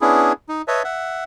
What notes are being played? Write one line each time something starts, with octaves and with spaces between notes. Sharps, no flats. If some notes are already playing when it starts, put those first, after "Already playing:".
B3 C#4 D4 E4 G#4
D#4
B4 C#5 D#5 E5 A5
E5 F#5